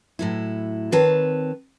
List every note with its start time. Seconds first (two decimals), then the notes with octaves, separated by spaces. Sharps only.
0.19 A2 F#3 E4
0.92 D#3 C4 B4 C#5 A5